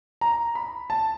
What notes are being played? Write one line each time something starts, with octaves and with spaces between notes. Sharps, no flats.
A#5
B5
A5